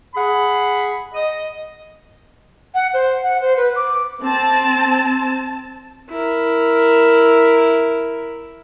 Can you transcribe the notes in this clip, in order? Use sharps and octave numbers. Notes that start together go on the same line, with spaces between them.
G#4 F#5 B5
D#5
F#5
C5
F#5
C5
B4
D6
C4 A5
E4 A#4